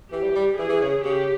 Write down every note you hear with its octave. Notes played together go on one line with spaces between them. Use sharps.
E3 G4
G3
E3
G3
E3 G#4
E3
C#3
C#3 G4